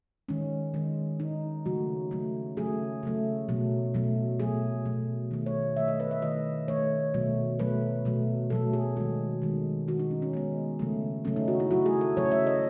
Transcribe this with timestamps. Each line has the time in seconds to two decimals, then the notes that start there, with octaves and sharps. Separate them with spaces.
0.29 D#3 G#3 C#4
0.74 D#3 G#3
1.20 D#3 G#3 D#4
1.66 C#3 F#3 A3 F#4
2.11 C#3 F#3 A3
2.57 C#3 F#3 A3 G#4
3.03 C#3 F#3 A3
3.49 B2 F#3 A3
3.94 B2 F#3 A3
4.40 B2 F#3 A3 G#4
4.86 B2 F#3 A3
5.31 D#3 A3
5.46 C#5
5.77 D#3 A3 E5
5.88 D#5
6.00 B4
6.11 E5
6.22 D#3 A3 D#5
6.68 D#3 A3 C#5
7.14 B2 F#3 A3
7.59 B2 F#3 A3 B4
8.05 B2 F#3 A3
8.50 B2 F#3 A3 A4
8.73 G#4
8.97 D#3 G#3 F#4
9.42 D#3 G#3
9.88 D#3 G#3 F#4
9.99 D#4
10.11 C#4
10.22 C#4
10.33 D#3 G#3 B3
10.79 C#3 F#3 A3
11.25 C#3 F#3 A3 C#4
11.36 D#4
11.48 F#4
11.60 E4
11.71 C#3 F#3 A3 F#4
11.86 G#4
12.01 A4
12.17 C#3 F#3 A3 C#5
12.32 E5
12.47 D#5